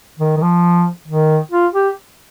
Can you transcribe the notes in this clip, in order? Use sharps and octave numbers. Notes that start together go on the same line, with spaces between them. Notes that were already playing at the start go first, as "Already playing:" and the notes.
D#3
D#3
F3
D#3
F4
G4